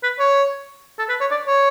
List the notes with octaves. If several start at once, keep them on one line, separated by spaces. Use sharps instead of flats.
B4
C#5
A4
B4
C#5
D5
C#5